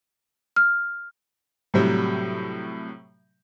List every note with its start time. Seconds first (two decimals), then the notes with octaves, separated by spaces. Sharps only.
0.56 F6
1.74 A2 C3 F#3 G3